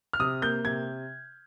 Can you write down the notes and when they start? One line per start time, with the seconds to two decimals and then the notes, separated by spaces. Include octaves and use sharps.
0.13 F6
0.20 C3 D#6
0.42 A#3 G6
0.65 C3 G#6